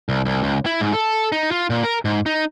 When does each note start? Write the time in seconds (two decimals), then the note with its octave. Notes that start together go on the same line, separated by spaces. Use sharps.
0.09 C2
0.25 C2
0.43 C#2
0.66 E4
0.80 G#2
0.93 A4
1.32 D#4
1.51 F4
1.70 A#2
1.84 A#4
2.05 G#2
2.26 D#4